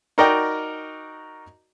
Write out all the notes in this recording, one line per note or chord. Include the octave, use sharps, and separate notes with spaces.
D#4 F#4 A#4 D5 D#5 G5